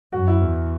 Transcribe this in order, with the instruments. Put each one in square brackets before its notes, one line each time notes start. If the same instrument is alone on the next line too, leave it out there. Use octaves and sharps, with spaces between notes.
[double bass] F#2 [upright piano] F#4
[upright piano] E4
[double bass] E2